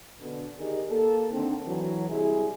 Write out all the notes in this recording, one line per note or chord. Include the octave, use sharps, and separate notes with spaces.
B2 D3
D#3 G4 G#4 A#4 D5 D#5
A#3 A4
D3 D#3 C4
E3 F#3
C3 G3 G#3 E4 G#4